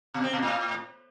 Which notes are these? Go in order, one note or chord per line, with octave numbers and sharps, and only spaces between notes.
B2
C4
B2
A2